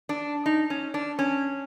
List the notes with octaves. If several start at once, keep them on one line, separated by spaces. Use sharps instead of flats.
D4
D#4
C#4
D4
C#4